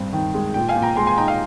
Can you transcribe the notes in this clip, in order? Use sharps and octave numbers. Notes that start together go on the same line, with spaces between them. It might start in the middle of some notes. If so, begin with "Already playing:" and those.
Already playing: G2 C4
D#3
G#3
A#2 G5
F5 G#5
A#2
G5 A#5
G#3 G#5 C6
G#5 C6
D#4 G5 A#5
F5